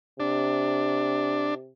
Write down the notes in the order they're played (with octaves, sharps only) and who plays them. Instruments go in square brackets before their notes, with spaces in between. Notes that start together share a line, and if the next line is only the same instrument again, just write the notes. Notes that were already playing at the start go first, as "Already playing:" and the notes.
[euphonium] C3 [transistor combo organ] D4